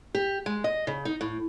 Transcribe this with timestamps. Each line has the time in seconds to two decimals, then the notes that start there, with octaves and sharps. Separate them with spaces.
0.15 G4
0.46 G#3
0.64 D#5
0.87 C#3
1.05 D#4
1.21 A2